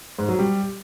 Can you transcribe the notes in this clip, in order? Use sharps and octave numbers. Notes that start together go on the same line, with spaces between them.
G#2
F#3
G3